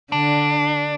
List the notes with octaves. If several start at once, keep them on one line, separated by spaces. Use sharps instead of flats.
D3 D4